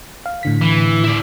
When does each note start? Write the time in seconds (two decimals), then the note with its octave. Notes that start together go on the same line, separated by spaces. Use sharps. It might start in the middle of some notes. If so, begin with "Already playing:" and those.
0.26 F5
0.43 A2 D3 B6
0.62 E3
1.04 E4 D5